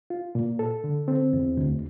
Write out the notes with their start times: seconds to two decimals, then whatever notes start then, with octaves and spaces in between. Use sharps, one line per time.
0.10 F4
0.35 A#2
0.59 A4
0.84 D3
1.08 C4
1.33 E2
1.57 D2